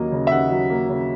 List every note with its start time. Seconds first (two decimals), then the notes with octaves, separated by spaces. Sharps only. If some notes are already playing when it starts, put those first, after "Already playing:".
Already playing: D#2 F#3 A#3 D#5
0.12 C#3
0.27 E5
0.31 D#2 F#5
0.51 F#3
0.70 A#3
0.89 C#3